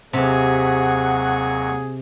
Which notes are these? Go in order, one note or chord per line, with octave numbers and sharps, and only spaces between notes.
D#2 C3 F#3 G#4 F#5 C#6